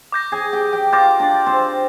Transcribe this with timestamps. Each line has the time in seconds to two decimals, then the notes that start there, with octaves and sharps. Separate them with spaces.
0.12 D6 G6 A#6
0.32 G#4 G#5
0.53 G4 G5
0.73 G4 G5
0.92 F4 F5 D6 G6 A#6
1.20 D4 D5
1.46 C4 C5